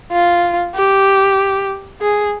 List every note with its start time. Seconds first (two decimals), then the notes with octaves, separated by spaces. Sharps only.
0.12 F4
0.75 G4
2.02 G#4